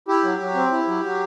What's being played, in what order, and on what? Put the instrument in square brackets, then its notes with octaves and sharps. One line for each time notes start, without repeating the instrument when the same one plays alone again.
[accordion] E4 G4
F#3
F#3
C4
E4
F#3
F#3